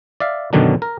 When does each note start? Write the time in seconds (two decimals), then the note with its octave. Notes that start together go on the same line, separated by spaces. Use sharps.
0.20 D5 E5 F5
0.53 F#2 B2 D3 D#3 F#3 D4
0.82 A#4